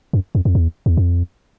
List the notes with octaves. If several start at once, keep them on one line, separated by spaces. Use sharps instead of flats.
F#2
F2
F2
E2
E2
F2